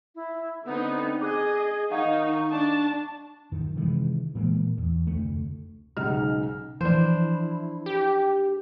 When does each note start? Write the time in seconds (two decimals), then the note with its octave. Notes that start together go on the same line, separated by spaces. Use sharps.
0.15 E4
0.65 D3 B3 C4 D#4
1.21 G#4 D#5 D6 F#6
1.91 D#3 D#4 D#5 F5 F#5 C#6
2.50 D4 A5
3.52 F#2 D#3
3.76 C3 D#3 E3 G#3
4.35 A#2 E3 G#3 A#3
4.78 E2
5.07 F1 D2 A3
5.97 B1 G#2 C#3 D#4 F6
6.81 E3 F3 D4 E4 C5
7.86 G4